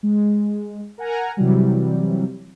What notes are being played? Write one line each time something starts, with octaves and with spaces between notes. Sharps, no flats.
G#3
A#4 F#5 G#5 A#5
C3 E3 F#3 G3